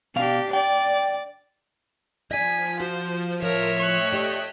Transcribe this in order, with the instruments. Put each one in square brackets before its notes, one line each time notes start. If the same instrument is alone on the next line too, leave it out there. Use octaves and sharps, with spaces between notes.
[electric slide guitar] B2 F5 [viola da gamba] D4 G4
[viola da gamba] D5 [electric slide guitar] G5
[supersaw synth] F3 [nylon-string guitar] D5 D#5 [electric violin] G#5 B6
[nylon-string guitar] F#4 [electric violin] C5
[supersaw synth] A2 C6 D#7 [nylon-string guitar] F3 [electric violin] A#4 [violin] C#5 E5
[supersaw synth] A3 D#5 G5 [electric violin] C#6 F#6
[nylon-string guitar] G4 D5